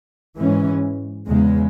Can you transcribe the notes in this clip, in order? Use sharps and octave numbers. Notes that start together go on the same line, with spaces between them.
G#2 E3 G#3 C#4
E2 C#3 G#3